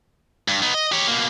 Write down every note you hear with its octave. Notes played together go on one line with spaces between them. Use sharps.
G2
B3 D#4
D#5
G4 C#5
B2 A#3